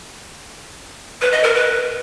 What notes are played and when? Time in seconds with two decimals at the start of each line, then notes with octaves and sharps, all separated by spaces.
1.22 B4
1.33 D#5
1.44 A#4
1.55 B4